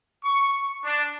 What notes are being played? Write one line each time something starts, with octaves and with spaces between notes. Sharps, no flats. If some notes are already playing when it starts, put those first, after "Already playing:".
C#6
D4